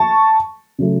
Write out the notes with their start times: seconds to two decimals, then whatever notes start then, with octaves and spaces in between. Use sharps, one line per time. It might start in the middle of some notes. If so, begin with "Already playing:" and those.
Already playing: A5 C#6
0.79 C#3 F#3 A3